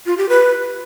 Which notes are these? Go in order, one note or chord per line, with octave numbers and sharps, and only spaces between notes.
F4
G4
B4